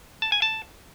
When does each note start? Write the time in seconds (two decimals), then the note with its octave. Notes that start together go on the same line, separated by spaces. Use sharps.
0.22 A5
0.32 G#5
0.42 A5